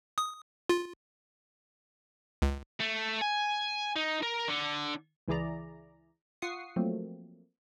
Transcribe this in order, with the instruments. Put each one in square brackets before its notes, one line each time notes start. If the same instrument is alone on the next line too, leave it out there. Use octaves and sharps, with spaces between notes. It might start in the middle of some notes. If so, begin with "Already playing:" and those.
[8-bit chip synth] D#6
F4
C#2
[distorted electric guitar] A3
G#5
D#4
A#4
D3
[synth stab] C#2 E3 E4 G#4 D5 A#5
F4 F#5 C#6 D#6 C7
F3 F#3 A3 A#3 C4